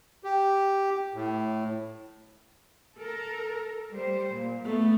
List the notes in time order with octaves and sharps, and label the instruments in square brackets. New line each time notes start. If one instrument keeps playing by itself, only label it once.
[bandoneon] G4
A2
[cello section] A4 A#4
G3 C5
A#2
[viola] A3 [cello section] B3